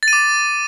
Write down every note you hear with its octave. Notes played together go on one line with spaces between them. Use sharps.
A6
D#7
D6